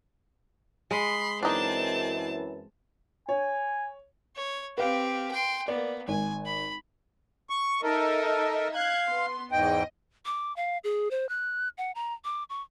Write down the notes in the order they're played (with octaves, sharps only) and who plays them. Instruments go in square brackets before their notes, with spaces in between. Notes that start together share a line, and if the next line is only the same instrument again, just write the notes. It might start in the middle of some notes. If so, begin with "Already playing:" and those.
[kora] G#3 [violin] B5 C6
[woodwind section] F#2 E3 [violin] C4 A5 [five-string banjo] D4 D#4
[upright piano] C#5 [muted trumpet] G#5
[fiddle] C#5
[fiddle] C4 G4 [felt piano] B4 F5
[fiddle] G5 C6
[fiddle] A#3 B3 [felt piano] D5
[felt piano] G#1 [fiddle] G#5
[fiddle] B5
[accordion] C#6
[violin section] D#4 D#5 E5 [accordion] A4 A#4
[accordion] F5 [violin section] F#6 G#6
[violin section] B3 C6
[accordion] E2 G#2 G5 [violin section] D#5
[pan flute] D6
F5
G#4
C5
F#6
F#5
A#5
D6
C#6